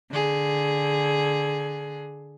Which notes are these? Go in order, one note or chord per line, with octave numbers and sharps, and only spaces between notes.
D3 G#4